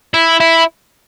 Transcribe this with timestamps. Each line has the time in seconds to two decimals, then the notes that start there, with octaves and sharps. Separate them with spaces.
0.14 E4
0.40 E4